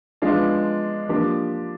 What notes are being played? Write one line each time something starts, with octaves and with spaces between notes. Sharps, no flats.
F3 G#3 B3 D4 F4
F3 A#3 D4 G4